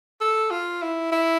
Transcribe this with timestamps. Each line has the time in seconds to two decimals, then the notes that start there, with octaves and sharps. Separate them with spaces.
0.21 A4
0.50 F4
0.82 E4
1.12 E4